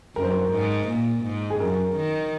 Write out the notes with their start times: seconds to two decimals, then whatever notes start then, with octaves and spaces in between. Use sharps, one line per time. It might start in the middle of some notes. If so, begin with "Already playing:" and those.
0.16 F#2 A#4
0.23 C5
0.31 A#4
0.52 G#2
0.88 A#2
1.24 G#2
1.50 G#4
1.60 F#2 A#4
1.96 D#3